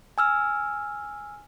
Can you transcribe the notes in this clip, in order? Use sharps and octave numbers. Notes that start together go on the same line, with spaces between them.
G#5 E6 F6